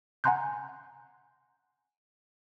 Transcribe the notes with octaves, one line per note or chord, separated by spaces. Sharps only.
F#5 G#5 A#5 C6 F#6 G6